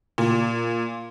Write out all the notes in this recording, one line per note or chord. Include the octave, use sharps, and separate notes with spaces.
A#2